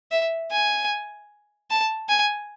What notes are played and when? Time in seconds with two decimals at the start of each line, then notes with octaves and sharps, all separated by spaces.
0.11 E5
0.51 G#5
1.70 A5
2.09 G#5